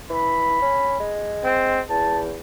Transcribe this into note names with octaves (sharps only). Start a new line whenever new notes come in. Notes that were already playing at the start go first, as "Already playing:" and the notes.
E3 B5
C#4
G#3
C4
E2 A5